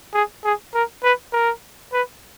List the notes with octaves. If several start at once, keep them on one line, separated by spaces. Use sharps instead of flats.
G#4
G#4
A#4
B4
A#4
B4